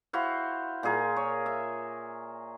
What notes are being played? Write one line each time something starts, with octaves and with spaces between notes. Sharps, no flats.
E4 F#4 C5 F5
A#2 F4 G#4 A#4
C#5
E5